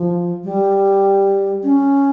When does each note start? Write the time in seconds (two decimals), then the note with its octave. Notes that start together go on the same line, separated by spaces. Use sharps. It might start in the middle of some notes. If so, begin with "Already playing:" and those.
Already playing: F3
0.44 G3
1.63 C#4